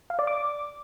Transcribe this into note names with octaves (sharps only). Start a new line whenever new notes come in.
F5
D5
D6